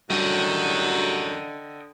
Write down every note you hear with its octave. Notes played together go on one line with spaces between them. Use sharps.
F#2 A2 D3 G3 F#4 D#5 G5